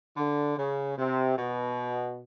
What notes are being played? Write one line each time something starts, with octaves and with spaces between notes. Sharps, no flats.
D3
C#3
C3
B2